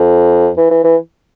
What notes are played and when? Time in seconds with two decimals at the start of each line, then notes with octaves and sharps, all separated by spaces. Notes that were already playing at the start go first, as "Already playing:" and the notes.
Already playing: F2
0.57 E3
0.70 E3
0.84 E3